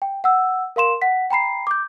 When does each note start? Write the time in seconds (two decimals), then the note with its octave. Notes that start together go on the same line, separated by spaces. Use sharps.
0.02 G5
0.24 F#5 E6
0.76 A#4 F5 C6 E7
1.02 F#5 B6
1.31 G5 A#5 B5 C7
1.67 D6 G6